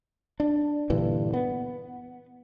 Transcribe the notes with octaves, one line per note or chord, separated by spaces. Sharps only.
D4
G2 A#2 D3 E3
B3